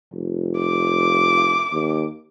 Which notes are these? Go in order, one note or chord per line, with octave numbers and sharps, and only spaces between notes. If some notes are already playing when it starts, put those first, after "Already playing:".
F1
D6
D#2